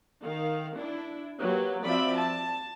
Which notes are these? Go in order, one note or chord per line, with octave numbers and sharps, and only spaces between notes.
D#3 F5
D4 E4
F#3 A#3 G4 B4
F3 C4 F#4 D5 E5 B5
A5